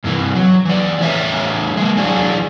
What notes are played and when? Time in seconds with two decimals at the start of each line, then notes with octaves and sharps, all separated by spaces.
0.04 G2 C3 E3
0.35 F#3
0.65 E3 D5
1.00 A2 C#3 E3 C#5 E5 A#5
1.77 G#3 A#3
1.97 E3 F#3 D4 G#4